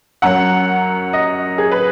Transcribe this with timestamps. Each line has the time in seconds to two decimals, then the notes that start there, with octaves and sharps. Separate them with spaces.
0.22 F#2 F#3 F#5
1.13 D#5
1.58 G#4
1.71 B4